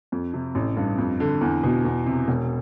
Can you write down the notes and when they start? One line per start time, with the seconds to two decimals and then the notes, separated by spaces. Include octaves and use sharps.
0.12 F2
0.34 C3
0.55 A1
0.77 G2
0.98 F2
1.20 D3
1.41 E2
1.64 B2
1.85 E2
2.06 C3
2.28 E1